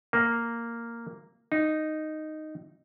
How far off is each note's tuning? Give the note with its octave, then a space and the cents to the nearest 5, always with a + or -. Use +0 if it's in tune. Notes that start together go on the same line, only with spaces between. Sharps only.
A#3 -5
D#4 -5